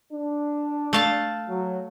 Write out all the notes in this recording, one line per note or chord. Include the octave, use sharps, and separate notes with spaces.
D4
A3 F5 A5
F#3